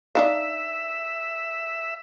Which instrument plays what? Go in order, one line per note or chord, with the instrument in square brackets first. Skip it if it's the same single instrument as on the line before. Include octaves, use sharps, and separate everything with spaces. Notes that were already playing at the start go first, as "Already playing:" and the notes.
[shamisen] D4 D#4 F5 [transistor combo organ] E5